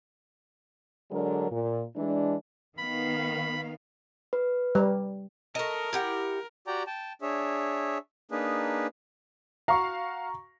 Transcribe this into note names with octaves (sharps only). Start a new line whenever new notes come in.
D3 F#3 G#3 D4 A#4
A#2
E3 G#3 D4
D#3 B3 F5 B5
B4
G3
A3 A#4 D#5
E4 G4 F#5
F#4 G4 D5 G5 A#5
G5 A5
D4 G#4 C#5 E5
A#3 D4 D#4 G#4 B4
F#4 F5 A#5 C#6